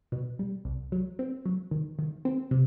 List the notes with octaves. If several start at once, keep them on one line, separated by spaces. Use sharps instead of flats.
B2
G3
C2
F#3
C4
F#3
D#3
D#3
C4
C3